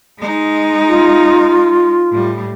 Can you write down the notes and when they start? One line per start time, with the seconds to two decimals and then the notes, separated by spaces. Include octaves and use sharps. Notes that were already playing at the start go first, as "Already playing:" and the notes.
0.19 G#3 D#4
0.88 F4
2.11 A2 G3